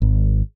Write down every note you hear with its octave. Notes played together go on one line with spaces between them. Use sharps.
G#1